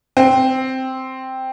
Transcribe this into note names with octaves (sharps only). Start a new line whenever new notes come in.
C4